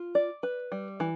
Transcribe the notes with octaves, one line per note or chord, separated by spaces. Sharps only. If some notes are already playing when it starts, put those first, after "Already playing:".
Already playing: F4
D5
B4
G3
E3